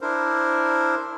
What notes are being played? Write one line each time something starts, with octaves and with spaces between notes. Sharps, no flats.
D4 E4 A#4 C5